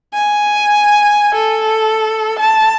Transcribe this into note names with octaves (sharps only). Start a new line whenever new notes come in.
G#5
A4
A5